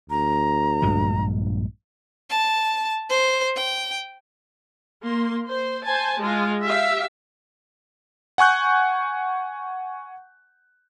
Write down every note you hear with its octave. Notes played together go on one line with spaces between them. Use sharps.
D2 A#5
A#1 G2 G#3
A5
C5
G5
A#3 C6
C5
C5 G#5 A5
G#3 F4
G4 E5 F5
F#5 G#5 C#6 F#6 G6